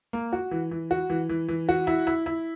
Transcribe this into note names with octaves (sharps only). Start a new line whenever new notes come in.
A#3
F#4
E3
E3
F#4
E3
E3
E3
F#4
E4
E4
E4